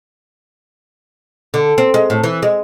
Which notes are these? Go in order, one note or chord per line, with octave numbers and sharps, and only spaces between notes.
D3
C4
G#3
A2
E3
G#3